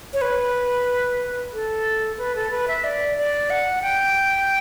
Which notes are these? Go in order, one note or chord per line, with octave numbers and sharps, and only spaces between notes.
C#5
B4
A4
B4
A4
B4
E5
D5
D5
F#5
G5